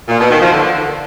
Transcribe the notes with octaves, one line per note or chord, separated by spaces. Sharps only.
A#2
B2
D#3
F3
D3